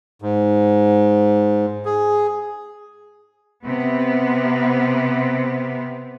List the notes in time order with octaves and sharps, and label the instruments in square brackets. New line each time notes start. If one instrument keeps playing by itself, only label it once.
[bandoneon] G#2
G#4
[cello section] C3 B3